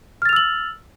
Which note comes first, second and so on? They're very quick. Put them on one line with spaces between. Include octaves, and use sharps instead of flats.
F6 A6 F7 E6 F#7